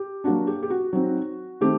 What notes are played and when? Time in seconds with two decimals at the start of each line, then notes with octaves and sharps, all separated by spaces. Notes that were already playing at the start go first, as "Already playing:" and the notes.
Already playing: G4
0.24 F#3 A#3 D4 F#4
0.47 G4
0.63 G4
0.70 F#4
0.93 F#3 C4 D#4
1.61 D#3 A3 C4 G4